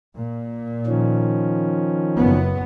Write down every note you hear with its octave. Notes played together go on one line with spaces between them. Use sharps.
A#2
D#3 F3 C#4
F#1 B3